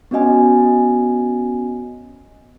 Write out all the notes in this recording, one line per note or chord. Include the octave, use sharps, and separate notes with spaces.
B3 C#4 F#4 D#5 G#5